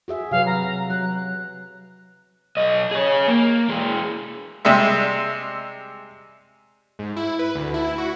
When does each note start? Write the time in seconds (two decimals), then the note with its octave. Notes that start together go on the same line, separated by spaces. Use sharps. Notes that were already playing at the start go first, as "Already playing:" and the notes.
0.08 F#4 G#4 E5
0.31 C3 F#3 B4 F5
0.46 A#5
0.90 F#3 F#6
2.56 B1 D#5
2.91 G#4 C#5
3.28 A#3
3.69 E2 G#3
4.65 C3 G3 G#3 E5
6.99 G#2
7.17 E4
7.39 B4
7.55 D2
7.74 E4
7.98 F#4